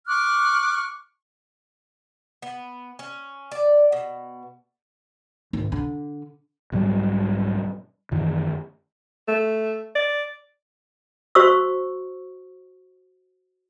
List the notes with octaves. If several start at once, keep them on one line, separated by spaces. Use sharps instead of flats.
C#6 D6 F6 F#6
B3
C#4
D5
B2
G#1
D3
B1 G#2 F#3 G3
F#2 D#3 E3
A3
D5
F#4 C5 C#6 E6